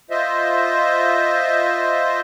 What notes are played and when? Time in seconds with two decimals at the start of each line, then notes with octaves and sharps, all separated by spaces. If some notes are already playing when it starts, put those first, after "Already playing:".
0.10 F4 C5 D#5 E5